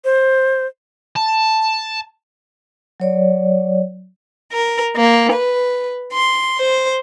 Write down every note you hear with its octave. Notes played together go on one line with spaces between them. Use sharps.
C5
A5
F#3 C#5 D5
A#4
A#3
B4
C6
C5